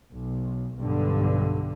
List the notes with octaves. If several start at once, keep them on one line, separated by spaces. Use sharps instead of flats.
B1
B1 G2 D3